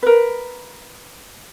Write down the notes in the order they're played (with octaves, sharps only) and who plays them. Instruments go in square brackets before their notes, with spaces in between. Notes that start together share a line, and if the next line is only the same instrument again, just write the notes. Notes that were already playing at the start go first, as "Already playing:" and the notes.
[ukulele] A#4 B4